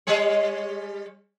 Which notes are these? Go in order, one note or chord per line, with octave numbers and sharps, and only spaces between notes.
G3 G#4 C#5